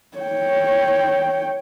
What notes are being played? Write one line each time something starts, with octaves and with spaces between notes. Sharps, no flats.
C#5 G5